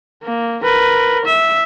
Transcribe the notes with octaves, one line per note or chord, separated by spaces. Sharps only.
A#3
A#4 B4
E5